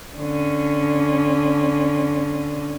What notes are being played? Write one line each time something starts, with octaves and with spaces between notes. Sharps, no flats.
D3 C#4